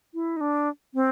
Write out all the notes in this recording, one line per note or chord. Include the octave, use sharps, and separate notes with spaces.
E4
D#4
D4
C4